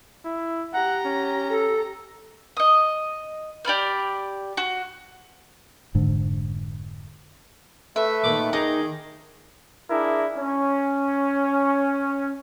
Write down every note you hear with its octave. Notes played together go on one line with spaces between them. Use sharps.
E4
G4 F#5 A#5
C#4
A4
D#5 D#6
G4 D5 B5 F6
F#4
F1 G#2 D3
A3 A4 B4 E5
A#2 D#3 D5 D6
D#4 G#4 D5
D4 E4 G#4 A#4
C#4